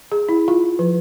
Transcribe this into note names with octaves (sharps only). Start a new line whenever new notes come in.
G#4
E4
F4
F3